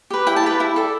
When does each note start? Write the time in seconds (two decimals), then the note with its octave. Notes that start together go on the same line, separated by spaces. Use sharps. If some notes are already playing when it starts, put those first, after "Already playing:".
0.10 G4 B4
0.27 E4 G5
0.36 A5
0.43 G4 B4 G5
0.60 E4
0.76 A4 D5